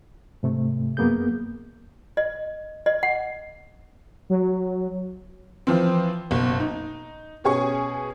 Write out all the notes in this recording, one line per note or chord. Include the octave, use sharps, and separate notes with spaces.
G#2 C3 A3
F#2 A#3 B3 G#4 G6
D#5
D#5
F#5
F#3
E3 F3 C4
F#1 B1
D#4
B2 C#4 G#4 C#6